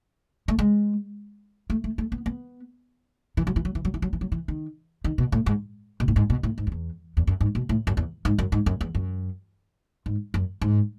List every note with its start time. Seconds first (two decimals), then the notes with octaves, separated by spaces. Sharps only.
0.48 A3
0.59 G#3
1.70 A3
1.84 A3
1.98 A3
2.12 B3
2.26 B3
3.37 E3
3.47 F#3
3.56 E3
3.65 F#3
3.75 E3
3.85 F#3
3.94 E3
4.02 F#3
4.13 E3
4.21 F#3
4.32 E3
4.48 D#3
5.04 D#3
5.18 B2
5.32 A2
5.46 G#2
6.00 B2
6.08 A2
6.16 G#2
6.30 B2
6.43 A2
6.58 G#2
6.67 F#2
6.72 E2
7.17 E2
7.27 F#2
7.41 G#2
7.55 B2
7.69 A2
7.87 F#2
7.97 E2
8.25 G#2
8.39 F#2
8.52 G#2
8.66 F#2
8.81 E2
8.95 F#2
10.06 G#2
10.34 F#2
10.61 G#2